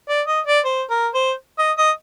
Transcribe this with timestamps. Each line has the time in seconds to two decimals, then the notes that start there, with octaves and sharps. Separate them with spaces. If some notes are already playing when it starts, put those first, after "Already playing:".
0.08 D5
0.27 D#5
0.46 D5
0.65 C5
0.90 A#4
1.14 C5
1.59 D#5
1.78 D#5